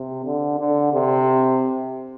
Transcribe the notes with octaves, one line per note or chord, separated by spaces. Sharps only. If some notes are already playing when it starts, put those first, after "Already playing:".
Already playing: C3
D3
D3
C3